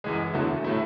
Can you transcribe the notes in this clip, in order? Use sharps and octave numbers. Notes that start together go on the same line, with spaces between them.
F#2 E3 G#3
E2 D3 F#3 A3 E4
A2 F#3 A3 E4